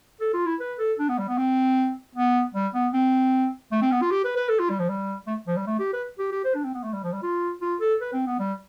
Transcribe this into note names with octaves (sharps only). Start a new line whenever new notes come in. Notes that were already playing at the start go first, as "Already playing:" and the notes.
A4
F4
E4
B4
A4
D4
B3
G3
B3
C4
B3
G3
B3
C4
A3
C4
B3
F4
G4
B4
B4
A4
F4
G3
F3
G3
A3
F3
G3
A3
G4
B4
G4
G4
C5
D4
C4
B3
A3
G3
F3
G3
F4
F4
A4
B4
C4
B3
G3